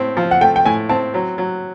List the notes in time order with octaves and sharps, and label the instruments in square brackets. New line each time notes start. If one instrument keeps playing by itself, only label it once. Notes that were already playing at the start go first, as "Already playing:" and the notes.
Already playing: [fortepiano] A2 C4
F3
[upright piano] F#5
[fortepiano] A3 [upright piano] G5
[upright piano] G5
[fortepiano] A2 [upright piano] G#5
[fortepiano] C4 [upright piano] A5
[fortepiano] F#3
F#3